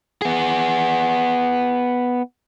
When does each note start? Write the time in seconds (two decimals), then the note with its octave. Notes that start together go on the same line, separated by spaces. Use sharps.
0.22 B3 G#4